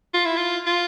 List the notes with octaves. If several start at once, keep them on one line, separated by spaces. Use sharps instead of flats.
F4
E4
F4
F4